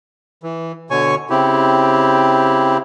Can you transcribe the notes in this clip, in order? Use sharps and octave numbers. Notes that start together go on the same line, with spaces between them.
E3
B2 D3 C#5 G#5 C#6
C#3 C4 E4 G4